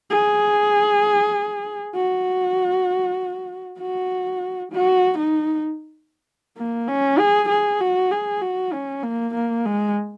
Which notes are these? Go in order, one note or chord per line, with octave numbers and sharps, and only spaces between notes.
G#4
F#4
F#4
F#4
D#4
A#3
C#4
G#4
G#4
F#4
G#4
F#4
C#4
A#3
A#3
G#3